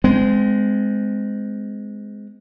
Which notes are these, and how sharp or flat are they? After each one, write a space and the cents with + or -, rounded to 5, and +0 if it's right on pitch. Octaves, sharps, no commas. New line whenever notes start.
G#3 +5 C4 -30